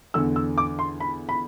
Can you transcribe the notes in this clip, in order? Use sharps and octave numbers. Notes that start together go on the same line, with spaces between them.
E2 D3 E6
E6
D6
C6
B5
B5